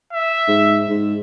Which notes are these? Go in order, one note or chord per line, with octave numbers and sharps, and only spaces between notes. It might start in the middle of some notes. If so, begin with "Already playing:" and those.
E5
G#2
G#2